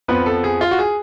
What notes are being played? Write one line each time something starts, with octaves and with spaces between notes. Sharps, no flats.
F2 F3 B3 B4
A4
G#4
F4
F#4
G#4